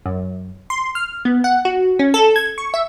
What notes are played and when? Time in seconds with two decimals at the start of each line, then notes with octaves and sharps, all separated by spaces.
0.06 F#2
0.70 C6
0.95 F6
1.25 B3
1.44 F#5
1.65 F#4
1.99 C#4
2.14 A4
2.36 G#6
2.58 C#6
2.74 E5